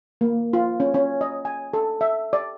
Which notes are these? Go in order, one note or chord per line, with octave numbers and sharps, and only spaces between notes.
A#3
F4
C#4
C#4
D#5
G#5
A4
E5
D5